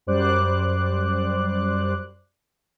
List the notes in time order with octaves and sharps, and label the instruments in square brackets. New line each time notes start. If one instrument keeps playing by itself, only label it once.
[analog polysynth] F#2 G3 C5 D5 D6 F#6